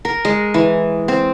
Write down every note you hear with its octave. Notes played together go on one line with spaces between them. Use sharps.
A#4
G#3
E3
C4